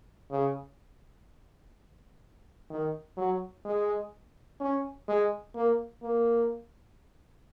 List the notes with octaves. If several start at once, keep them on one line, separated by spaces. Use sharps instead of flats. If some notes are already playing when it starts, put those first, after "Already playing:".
C#3
D#3
F#3
G#3
C#4
G#3
A#3
A#3